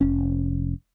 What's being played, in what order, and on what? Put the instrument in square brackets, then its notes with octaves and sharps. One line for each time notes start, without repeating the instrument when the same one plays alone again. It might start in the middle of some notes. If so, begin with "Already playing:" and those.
[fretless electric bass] F1 C#4